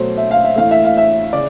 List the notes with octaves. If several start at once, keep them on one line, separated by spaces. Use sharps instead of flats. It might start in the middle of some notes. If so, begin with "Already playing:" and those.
Already playing: B2 F#3 A3 C5
E5
F5
E5
A2 E3 A3 F5
E5
F5
E5
C#3 D5